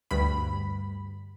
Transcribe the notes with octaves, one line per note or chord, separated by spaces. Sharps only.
D2 G2 B5